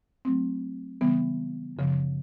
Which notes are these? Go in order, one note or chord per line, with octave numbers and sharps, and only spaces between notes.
F#3 A3 C4
C#3 E3 G3 B3
F#2 C#3 F3